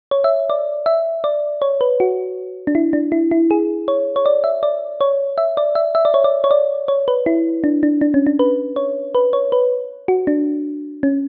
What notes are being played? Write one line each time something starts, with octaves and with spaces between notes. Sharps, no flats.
C#5
E5
D5
E5
D5
C#5
B4
F#4
D4
E4
D4
E4
E4
G#4
C#5
C#5
D5
E5
D5
C#5
E5
D5
E5
E5
D5
C#5
D5
C#5
D5
C#5
B4
E4
D4
D4
D4
C#4
D4
B4
C#5
B4
C#5
B4
F#4
D4
C#4